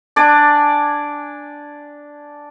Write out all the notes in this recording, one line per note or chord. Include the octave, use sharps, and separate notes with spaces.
D4 D5 G#5